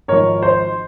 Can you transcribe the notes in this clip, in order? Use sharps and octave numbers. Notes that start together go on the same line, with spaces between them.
G#1 G#2 F3 A#4 C#5
C5